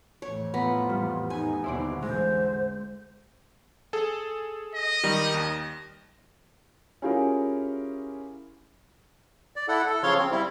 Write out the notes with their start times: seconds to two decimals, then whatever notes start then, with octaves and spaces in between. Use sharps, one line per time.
0.22 F2 A2 E3 C#5
0.54 B3 F4 A#5
0.89 G3
1.30 D#4 G#5
1.64 D#2 B2 D3 E4 C5 D5
2.02 A1 E2 D3 G#3 C5
3.93 G#4 A4
4.74 D#5
5.03 D#3 G3 D#4
5.34 D#2
7.02 C#4 E4 F4 G4 G#4 A#4
9.56 D5
9.68 E4 A4 F#5
9.87 A4
10.03 C#3 F3 C#5 F5 C6
10.19 C4
10.32 G3 E4